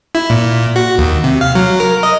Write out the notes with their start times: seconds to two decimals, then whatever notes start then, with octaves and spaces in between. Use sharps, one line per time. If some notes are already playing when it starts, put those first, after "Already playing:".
0.15 E4
0.30 A#2
0.76 F#4
0.98 D#2
1.24 C3
1.41 F5
1.55 F#3
1.80 A#4
2.03 D#5